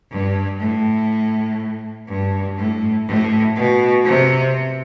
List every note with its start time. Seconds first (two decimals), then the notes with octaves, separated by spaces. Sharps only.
0.11 G2
0.60 A2
2.08 G2
2.57 A2
3.07 A2
3.56 B2
4.05 C3